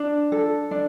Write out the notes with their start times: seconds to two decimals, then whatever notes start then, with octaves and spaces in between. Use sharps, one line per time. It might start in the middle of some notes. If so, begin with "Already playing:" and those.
Already playing: D4
0.32 A4
0.71 D4